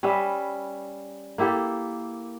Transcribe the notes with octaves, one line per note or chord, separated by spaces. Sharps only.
G3 C#4 B4 E5
A#3 E4 G4 A4